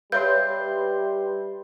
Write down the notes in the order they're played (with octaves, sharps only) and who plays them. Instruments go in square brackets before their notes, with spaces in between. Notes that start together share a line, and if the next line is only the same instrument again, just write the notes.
[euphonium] G3 [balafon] G4 C#5 F5 [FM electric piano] B4 E5 C6 [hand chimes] G6